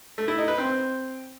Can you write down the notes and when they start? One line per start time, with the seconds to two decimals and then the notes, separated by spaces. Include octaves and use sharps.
0.18 A3
0.28 E4
0.38 D#4
0.48 B4
0.58 C4